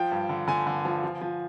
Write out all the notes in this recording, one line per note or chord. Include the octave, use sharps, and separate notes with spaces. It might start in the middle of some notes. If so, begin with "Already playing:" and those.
Already playing: F3 G5
G2
D3
D3 G#5
D3
F3
F3
F3